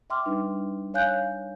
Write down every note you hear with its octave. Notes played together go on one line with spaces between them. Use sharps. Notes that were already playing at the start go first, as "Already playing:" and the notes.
E5 G5 C6 D6 F6
G3 D4 D#4 B4
C#5 F5 G#5 F#6 G6